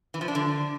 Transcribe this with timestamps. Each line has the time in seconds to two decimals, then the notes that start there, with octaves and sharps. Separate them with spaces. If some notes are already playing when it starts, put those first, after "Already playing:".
0.14 E3
0.21 F3
0.28 D4
0.35 D3